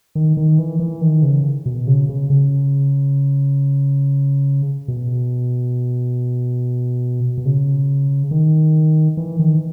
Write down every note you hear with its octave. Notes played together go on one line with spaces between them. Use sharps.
D#3
D#3
E3
E3
D#3
C#3
B2
C#3
C#3
C#3
B2
B2
C#3
D#3
E3
D#3